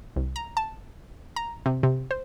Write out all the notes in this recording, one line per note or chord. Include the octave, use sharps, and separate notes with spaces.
C2
A#5
A5
A#5
C3
C3
C5